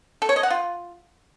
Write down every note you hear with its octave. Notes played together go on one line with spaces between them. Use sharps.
A4
C#5
D#5
F#5
F4